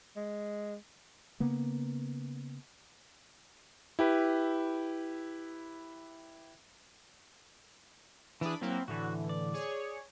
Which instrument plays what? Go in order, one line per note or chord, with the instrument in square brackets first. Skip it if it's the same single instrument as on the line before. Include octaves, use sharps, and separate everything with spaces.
[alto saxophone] G#3
[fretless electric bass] C#3 A#3 B3
[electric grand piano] E4 G4 B4
[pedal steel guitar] E3 G#4 [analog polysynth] D4 B5
[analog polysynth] F#3 A#3 E4 [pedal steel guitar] C4
[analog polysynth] A2 D3 E3 [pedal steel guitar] F#4
[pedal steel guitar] D5
[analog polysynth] G#4 C#5